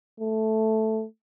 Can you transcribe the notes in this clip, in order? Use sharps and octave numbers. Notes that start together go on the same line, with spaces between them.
A3